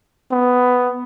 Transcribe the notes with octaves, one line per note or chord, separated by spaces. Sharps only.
B3